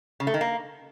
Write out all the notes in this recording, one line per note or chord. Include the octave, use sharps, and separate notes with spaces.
C#3
A3
D#3
A#3